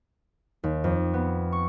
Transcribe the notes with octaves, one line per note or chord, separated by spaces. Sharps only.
D#2
F2
B3
C#6